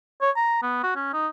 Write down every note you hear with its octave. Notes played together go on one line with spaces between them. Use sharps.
C#5
A#5
B3
F#4
C#4
D#4